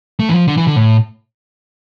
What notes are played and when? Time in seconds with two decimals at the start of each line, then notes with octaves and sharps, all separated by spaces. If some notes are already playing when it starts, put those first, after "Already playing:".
0.19 A3
0.29 E3
0.34 F3
0.48 D3
0.57 E3
0.67 D3
0.76 A2